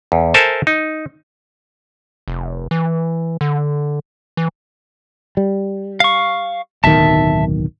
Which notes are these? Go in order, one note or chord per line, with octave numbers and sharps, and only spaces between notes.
E2
A4 A#4 C5 E5 G#5 A5
D#4
F1
E3
D3
E3
G3
F5 C#6
D1 B1 D#3 E5 A5